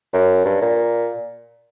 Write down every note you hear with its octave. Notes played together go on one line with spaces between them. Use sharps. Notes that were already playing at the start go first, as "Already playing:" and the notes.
F#2
G2
A#2